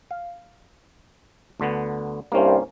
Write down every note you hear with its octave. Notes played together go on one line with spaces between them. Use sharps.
F5
D2 D3 B3
C2 G2 A#3 C#4 C5